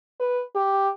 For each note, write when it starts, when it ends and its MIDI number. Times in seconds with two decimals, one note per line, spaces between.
0.20 0.42 71
0.55 0.89 67